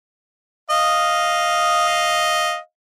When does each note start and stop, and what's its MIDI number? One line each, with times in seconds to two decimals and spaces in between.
0.70 2.58 75
0.70 2.58 77